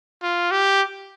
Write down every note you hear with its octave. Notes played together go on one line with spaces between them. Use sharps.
F4
G4